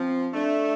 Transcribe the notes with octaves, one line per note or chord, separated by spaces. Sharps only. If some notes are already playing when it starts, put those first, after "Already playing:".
Already playing: F3 C4
A3 D4